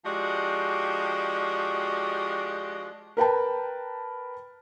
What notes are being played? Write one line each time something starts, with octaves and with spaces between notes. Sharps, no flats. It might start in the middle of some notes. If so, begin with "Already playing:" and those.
F3 G#3 D4 F#4 G4 D#5
A#4 B4 G5 A5